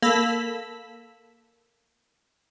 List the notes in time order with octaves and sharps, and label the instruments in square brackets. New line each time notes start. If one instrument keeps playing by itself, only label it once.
[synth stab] A#3 A4 B5 E6 B6